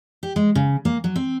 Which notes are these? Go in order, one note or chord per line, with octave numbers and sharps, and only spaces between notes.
G4
G#3
C#3
A#3
F#3
C4